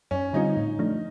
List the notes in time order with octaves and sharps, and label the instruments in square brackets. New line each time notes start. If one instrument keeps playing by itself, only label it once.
[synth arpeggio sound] F#2 [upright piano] C#4
[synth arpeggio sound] D3 G3 C4 F4 [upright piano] D#4
[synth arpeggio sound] A2
F3 A3 D4